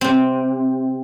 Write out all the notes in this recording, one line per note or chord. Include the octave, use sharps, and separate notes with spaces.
C3 C4